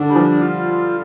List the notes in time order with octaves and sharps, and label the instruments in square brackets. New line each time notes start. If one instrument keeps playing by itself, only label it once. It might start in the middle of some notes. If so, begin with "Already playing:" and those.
Already playing: [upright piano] D3 [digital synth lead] D4
[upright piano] G3
F3
[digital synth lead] F4